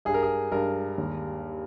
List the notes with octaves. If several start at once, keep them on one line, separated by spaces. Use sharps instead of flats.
G2 G#4
A#4
G#4
G2 A#4
D#2